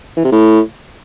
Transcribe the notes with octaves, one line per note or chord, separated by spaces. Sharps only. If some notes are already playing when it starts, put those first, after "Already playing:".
E3
C3
A2